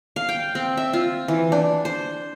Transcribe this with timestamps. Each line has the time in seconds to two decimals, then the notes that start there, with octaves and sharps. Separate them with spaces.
0.16 F5
0.29 G5
0.55 C4
0.77 E5
0.93 F4
1.28 E3
1.52 D4
1.85 C5